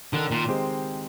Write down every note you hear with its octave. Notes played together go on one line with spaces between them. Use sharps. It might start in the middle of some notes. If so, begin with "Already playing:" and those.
D3 D#3
A#2
G#3 C4 G4 C5